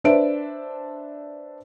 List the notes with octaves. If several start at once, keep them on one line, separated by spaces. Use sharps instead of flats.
D4 B4 C5 D5 E5 D7